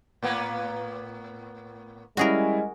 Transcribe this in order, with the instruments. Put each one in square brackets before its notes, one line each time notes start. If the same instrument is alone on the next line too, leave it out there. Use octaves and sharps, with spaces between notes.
[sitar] A2 A#3 B3
[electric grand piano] G3 C#4 E4 [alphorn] G#3 [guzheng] F#4 G#4 A#4